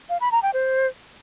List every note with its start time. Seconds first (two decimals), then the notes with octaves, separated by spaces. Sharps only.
0.10 F5
0.21 B5
0.32 A#5
0.43 G5
0.54 C5